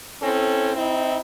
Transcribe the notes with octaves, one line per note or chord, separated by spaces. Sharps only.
C4 C#4 E4 A4
C4 D#4 E4